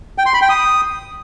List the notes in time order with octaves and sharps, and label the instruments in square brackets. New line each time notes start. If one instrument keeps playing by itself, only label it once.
[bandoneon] G5
C6
B5
G5
D#6